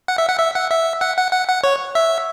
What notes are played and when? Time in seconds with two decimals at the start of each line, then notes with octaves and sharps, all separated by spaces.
0.08 F#5
0.18 E5
0.29 F#5
0.39 E5
0.55 F#5
0.71 E5
1.01 F#5
1.17 F#5
1.32 F#5
1.49 F#5
1.64 C#5
1.95 E5